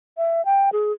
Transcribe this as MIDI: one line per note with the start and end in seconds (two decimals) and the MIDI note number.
0.17 0.44 76
0.45 0.70 79
0.73 0.92 68